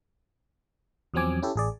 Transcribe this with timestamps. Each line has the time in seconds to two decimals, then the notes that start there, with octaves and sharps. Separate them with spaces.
1.14 E2 F3 F#3 C4 G#5 D6
1.42 C#4 E4 G4 A4
1.56 A1 G#4 D5